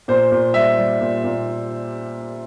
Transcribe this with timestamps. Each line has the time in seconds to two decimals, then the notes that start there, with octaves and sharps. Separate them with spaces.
0.08 A#2 C5
0.32 A#2
0.54 G3 E5
0.78 G3
1.01 A#2
1.24 A#2